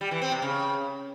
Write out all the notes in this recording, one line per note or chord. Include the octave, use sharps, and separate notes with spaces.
G3
E3
C4
C3
C#3